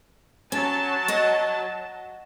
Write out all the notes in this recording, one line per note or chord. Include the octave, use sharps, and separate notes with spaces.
F#3 C#4 A5
D#5 F#5